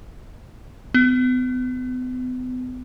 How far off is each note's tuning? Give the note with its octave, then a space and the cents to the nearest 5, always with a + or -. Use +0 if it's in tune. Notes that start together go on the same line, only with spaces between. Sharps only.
B3 +40